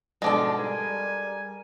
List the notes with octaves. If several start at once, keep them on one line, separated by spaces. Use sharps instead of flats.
G#2 B2 F3 G#3 D4 A4
G3 A#4 G#5